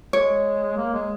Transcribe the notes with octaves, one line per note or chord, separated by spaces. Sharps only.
G#3 C#5
A#3
G#3